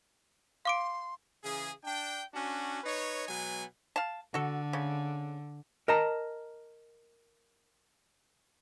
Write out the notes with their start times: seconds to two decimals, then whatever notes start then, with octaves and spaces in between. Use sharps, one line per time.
0.65 F5 C6 D6 D7
1.44 C#3 E3 G#4
1.84 D4 G5
2.34 C#4 D4 F#4
2.84 D#4 B4 C#5
3.28 B2 F#3 G#3 B3 G#5
3.96 F5 A5
4.34 D3 F#4 A4
4.73 C#3
5.88 A#4 D#5 A5 A#5